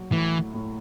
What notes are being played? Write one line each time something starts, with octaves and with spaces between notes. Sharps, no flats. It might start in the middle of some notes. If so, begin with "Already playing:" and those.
Already playing: F#3
A2 E3
A2